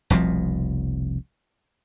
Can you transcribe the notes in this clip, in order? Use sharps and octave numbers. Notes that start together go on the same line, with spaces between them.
F1 C2 B2 F3